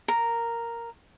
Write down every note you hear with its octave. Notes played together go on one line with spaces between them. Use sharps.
A#4